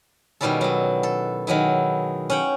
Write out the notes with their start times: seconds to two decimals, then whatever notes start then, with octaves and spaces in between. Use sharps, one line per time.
0.41 B2 D#3 G3 C#4 E4 A4
0.61 F#3 B3
1.03 A4
1.47 D#3 F#3 G#3 E4
2.30 C#4 F#5 G5